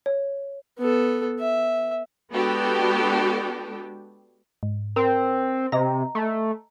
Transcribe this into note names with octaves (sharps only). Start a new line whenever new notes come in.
C#5
B3 A4
E5
G#3 B3 D4 F#4 G4 A4
G#2
C4 A#4
C3 D#5 A#5
A3